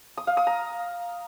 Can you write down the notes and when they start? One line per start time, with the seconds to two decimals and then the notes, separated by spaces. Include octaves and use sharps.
0.17 D#6
0.27 F5
0.37 D#6
0.47 A#5